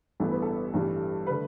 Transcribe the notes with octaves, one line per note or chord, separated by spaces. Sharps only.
A1 G2 E3 B3 A4
B4
A4
A1 G2 E3 G3
D3 A3 B4